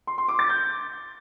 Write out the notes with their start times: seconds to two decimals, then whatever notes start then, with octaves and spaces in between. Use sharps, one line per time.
0.07 C6
0.18 C6
0.28 D6
0.39 A6
0.49 G6